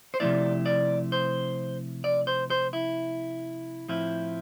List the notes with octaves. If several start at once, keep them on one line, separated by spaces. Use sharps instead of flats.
C5
C3 F3 A3 E4 D5
D5
C5
D5
C5
C5
E4
A2 F3 C4 E4